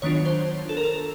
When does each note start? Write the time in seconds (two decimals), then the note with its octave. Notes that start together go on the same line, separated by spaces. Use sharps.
0.02 D#3 F#3 B3 D4 F4 C#5
0.25 C5
0.69 A4
0.77 A#4
0.83 A4